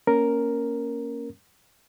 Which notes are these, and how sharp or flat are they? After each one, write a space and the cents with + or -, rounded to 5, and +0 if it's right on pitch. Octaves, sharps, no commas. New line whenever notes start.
A#3 +0 C#4 +0 A#4 +0